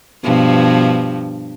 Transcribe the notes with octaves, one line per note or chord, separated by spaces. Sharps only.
G2 B2 F3